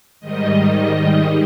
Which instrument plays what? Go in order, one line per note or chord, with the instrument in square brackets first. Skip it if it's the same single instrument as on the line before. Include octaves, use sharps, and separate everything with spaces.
[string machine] G#2 D#3 G3 D#5